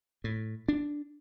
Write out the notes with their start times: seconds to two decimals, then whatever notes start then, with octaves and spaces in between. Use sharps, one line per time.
0.24 A2
0.68 D4